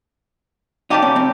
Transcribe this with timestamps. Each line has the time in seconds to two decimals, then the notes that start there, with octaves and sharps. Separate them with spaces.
0.90 G3 A#3 D4 D#4 G4
1.02 C#4
1.16 C4